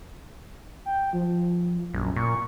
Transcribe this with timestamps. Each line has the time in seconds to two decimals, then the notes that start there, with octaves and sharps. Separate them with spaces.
0.86 G5
1.13 F3
1.94 A#1 F#2
2.16 A#2 C#6